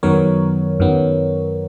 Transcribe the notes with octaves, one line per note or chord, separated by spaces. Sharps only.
F#2 D#3 F#3 B3 A#4 C#5
F#2 D#3 F#3 B3